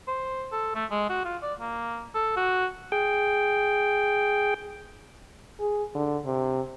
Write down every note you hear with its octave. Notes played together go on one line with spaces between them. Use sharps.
C5
A4
A3
G#3
F#4
F4
D5
A#3
A4
F#4
G#4 G5
G#4
D3
C3